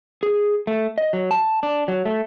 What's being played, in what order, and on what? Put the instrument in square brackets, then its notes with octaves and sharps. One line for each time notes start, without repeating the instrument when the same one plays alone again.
[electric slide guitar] G#4
A3
D#5
F#3
A5
D4
F#3
A3